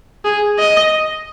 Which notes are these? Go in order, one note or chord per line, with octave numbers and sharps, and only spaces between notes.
G#4
D#5